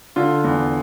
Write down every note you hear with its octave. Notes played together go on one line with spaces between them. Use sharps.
D3 F4
E2